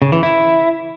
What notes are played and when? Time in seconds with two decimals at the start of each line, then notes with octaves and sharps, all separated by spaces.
0.02 C#3
0.12 E3
0.23 E4